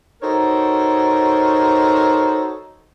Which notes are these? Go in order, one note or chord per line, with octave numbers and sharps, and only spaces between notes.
D#4 F#4 A4 A#4 C5 C#5